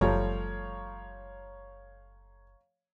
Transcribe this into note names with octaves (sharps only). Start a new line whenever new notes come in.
F#1 F3 G3 A3 C#5 F5 A#5